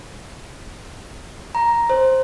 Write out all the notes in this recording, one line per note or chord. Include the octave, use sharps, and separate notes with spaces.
A#5
C5